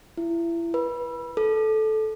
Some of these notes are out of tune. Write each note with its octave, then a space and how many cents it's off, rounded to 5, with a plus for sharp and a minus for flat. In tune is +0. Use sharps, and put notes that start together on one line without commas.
E4 +30
B4 -25
A4 -15